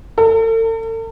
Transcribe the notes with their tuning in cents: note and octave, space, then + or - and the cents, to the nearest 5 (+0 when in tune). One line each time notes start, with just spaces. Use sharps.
A4 +45